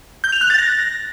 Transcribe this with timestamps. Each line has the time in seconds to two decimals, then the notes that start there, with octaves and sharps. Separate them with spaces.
0.24 G6
0.32 F7
0.41 F#6
0.50 A6
0.59 A#6